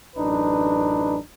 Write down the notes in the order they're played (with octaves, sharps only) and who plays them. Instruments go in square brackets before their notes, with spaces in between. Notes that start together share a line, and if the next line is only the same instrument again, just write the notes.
[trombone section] A1 F#2 D4 D#4 B4